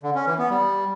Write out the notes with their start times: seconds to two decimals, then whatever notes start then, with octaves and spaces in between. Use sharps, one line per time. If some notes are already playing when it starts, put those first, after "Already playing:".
0.03 D3
0.15 C#4
0.27 E3
0.38 B3
0.50 G3